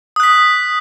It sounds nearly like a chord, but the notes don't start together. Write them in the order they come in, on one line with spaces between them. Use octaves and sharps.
D#6 F#6 B6